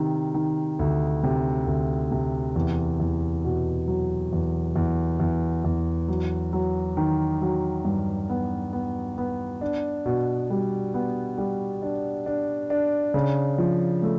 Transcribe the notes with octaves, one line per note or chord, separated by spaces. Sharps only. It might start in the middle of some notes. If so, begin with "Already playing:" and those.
Already playing: C3 D#3
D#3
D2
C3
D2
C3
E2
E2
B2
F#3
E2
E2
E2
E2
F#3
F#3
D#3
F#3
G2
B3
B3
B3
D4
B2
G3
B3
G3
D4
D4
D4
C#3
F3
A3